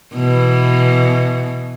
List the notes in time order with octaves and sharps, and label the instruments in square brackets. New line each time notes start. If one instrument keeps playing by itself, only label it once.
[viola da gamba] B2 E3